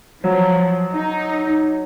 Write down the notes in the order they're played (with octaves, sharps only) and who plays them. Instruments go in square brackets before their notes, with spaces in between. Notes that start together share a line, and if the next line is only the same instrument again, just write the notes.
[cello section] F3 [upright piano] F#3
[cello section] D#4